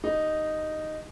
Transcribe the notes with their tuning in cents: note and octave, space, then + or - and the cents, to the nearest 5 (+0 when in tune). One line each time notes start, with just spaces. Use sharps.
D#4 -5 G4 +0